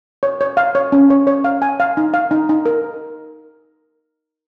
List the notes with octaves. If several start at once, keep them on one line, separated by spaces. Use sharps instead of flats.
C#5
C#5
F5
C#5
C#4
C#5
C#5
F5
G#5
F5
D#4
F5
D#4
D#4
A#4